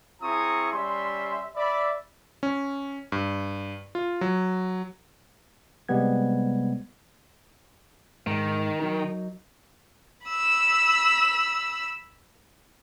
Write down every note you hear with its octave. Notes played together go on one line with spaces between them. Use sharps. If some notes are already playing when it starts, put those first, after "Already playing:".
C4 E4 G#4 A#5 C#6 D#6
G3 C#4 E5 C6
D5 E5 B5
C#4
G2
F4
F#3
C3 G3 G#3 B3 G#6
G#2 D#3
F#3 D#4 A#4
B5 E6